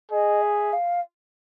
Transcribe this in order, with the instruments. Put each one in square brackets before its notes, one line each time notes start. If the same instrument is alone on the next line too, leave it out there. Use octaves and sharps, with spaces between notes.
[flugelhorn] G#4 [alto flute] D#5
[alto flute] E5
F5